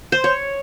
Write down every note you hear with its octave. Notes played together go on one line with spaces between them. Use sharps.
C5
C#5